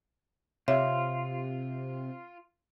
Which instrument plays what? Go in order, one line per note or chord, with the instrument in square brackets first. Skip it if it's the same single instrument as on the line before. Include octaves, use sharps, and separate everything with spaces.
[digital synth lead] C3 [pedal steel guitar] F4 [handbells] C#5 [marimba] E5